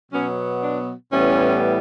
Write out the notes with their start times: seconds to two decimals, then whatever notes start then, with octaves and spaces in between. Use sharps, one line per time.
0.12 B2 F#3 B3 C#4
0.63 D4
1.13 A2 E3 G3 B3 C#4